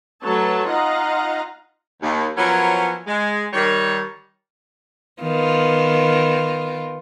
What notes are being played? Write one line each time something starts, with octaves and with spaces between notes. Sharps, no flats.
F#3 A3 A4 B4 C#5 A5
D#4 F4 D#5 F5 F#5 A#5
D#2
F3 F#3 B3 C#4 E4 A#4
G#3
D#3 G3 C#5
D#3 B3 F4